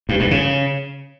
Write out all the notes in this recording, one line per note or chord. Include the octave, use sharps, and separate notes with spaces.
G2
G2
C#3